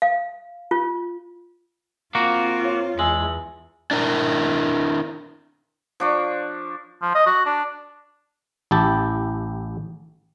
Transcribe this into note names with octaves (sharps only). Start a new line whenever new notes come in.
F5
F4
A#3 C4 F4 F#4
C#5
E2 G#3 G#5 E6 F#7
D4 E4 A#4
F3 D4 C#6
F3
D#5
F#4
D4
A1 E4 G4 A5